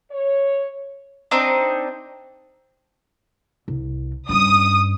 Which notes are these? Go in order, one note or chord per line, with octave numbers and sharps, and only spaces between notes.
C#5
C4 D4 D#4 C5
C2
G2 C#4 D#6